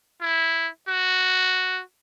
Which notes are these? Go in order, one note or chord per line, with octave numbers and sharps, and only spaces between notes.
E4
F#4